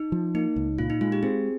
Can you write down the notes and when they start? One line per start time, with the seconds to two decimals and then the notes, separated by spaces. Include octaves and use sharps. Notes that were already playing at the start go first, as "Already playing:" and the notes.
Already playing: D#4
0.12 F3
0.34 A#3 D#4
0.56 C#2
0.79 A#2 F4
0.90 D#4
1.01 G#3 F4
1.12 G4
1.23 C4 G#4